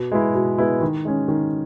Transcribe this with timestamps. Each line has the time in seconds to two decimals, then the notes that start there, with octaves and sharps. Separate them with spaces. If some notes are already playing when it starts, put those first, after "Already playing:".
Already playing: B2
0.12 G#3 B3 E4
0.35 B2
0.58 G#3 B3 E4
0.81 D#3
1.05 G#3 C#4
1.28 D#3